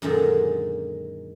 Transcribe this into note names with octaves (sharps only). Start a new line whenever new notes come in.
F#2 A#2 D3 D#3 G#3